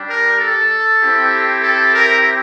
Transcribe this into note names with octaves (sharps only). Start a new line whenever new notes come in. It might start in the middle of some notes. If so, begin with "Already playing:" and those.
Already playing: G3 D4 G4
A#4
A4
C4 E4 G4
A4
A#4